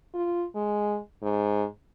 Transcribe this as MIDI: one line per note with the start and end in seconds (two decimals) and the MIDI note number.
0.14 0.45 65
0.55 0.98 56
1.22 1.65 44